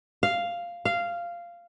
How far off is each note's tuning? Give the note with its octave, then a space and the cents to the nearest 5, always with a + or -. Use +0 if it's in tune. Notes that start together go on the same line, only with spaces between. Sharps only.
F5 -5
F5 -10